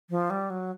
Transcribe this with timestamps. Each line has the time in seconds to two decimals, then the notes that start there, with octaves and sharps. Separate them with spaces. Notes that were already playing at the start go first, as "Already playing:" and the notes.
0.10 F3
0.30 G3
0.50 F#3